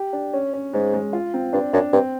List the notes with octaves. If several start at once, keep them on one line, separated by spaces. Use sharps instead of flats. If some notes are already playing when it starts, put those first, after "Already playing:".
Already playing: G4
D4
C#4
C#4
G#2 G#3
G#3
F4
C4
G2 D4
F#2 D4
G2 C4